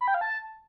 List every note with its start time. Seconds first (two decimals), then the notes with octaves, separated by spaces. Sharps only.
0.01 B5
0.08 G5
0.14 F5
0.21 A5